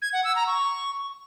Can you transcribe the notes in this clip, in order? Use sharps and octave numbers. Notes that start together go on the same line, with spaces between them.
G#6
F#5
E6
A#5
C#6